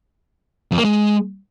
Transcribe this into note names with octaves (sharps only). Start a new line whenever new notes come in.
F2
A#3
G#3